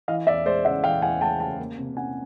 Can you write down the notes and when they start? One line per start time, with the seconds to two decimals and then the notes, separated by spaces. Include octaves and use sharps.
0.08 E3 D#5 F5
0.27 E2 D5 E5
0.46 G#3 C5 D5
0.64 C#3 E5 F#5
0.84 E3 F5 G5
1.02 E2 F#5 G#5
1.21 G#3 G5 A5
1.40 C#3 G5 A5
1.59 A#3
1.78 C3
1.97 C#4 F#5 G#5